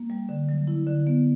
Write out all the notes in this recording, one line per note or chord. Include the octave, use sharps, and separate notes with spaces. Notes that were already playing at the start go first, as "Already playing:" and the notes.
Already playing: A#3
G3
D3
F#3
E4
D3
B3